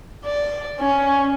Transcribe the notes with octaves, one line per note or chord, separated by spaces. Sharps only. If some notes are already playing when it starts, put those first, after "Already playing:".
D5
C#4